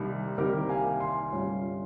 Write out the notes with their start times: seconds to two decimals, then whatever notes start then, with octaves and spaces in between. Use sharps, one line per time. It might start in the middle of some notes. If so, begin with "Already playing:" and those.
Already playing: C2 C3 D#3 G3 A#3
0.38 C2 C3 D#3 G3 A#3 G4 A#4
0.69 F5 G#5
1.00 G#5 C6
1.32 G1 G2 G3 C#4 F4